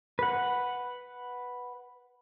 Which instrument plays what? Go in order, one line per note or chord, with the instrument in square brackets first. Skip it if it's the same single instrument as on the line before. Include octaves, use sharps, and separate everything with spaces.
[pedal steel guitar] B4 F#5